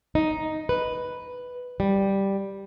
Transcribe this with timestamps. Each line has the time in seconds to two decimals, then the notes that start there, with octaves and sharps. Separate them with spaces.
0.15 D#4
0.69 B4
1.80 G3